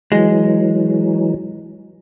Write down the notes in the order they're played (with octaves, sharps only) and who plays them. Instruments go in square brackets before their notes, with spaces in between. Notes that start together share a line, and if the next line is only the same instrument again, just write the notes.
[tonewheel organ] E3 F#3 [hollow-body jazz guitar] G#3